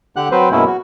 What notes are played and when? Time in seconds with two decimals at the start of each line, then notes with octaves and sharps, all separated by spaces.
0.16 D3 G4 F#5 F#6
0.31 F#3 C4 B4 C5
0.51 F#2 B2 G#3 A#3 C#4 E4
0.67 F#4